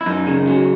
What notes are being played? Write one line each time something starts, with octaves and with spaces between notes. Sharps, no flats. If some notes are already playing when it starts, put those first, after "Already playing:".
E4
F#2 D#4
C#3
F#3